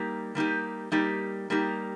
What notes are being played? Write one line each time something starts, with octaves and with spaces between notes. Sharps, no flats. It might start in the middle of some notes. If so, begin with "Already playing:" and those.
Already playing: G3 A#3 D#4 G4
G3 A#3 D#4 G4
G3 A#3 D#4 G4
G3 A#3 D#4 G4